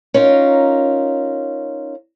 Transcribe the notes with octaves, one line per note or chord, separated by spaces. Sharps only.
C#4 D#4 F4 A#4